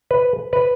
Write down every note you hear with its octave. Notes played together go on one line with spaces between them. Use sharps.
B4
B4